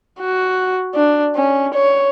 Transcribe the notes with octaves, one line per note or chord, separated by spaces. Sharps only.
F#4
D4
C#4
C#5